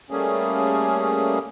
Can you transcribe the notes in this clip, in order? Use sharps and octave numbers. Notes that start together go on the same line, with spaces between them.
G3 A3 A#3 C#4 G#4